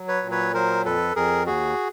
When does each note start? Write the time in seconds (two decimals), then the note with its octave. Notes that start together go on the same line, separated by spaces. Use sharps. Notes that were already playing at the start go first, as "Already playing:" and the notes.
Already playing: F#3
0.08 B4 C#5
0.23 A#2
0.31 B4 C#5
0.54 F#3 A#4 C5
0.85 F2 A4 B4
1.15 F2 G#4 A#4
1.46 D#2 F#4 G#4